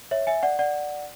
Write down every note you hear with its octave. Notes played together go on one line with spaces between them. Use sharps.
C#5 E5
E5 G#5
D5 F#5
D5 F#5